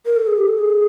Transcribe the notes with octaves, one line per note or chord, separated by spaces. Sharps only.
A#4
A4
G#4
G4
A4
G#4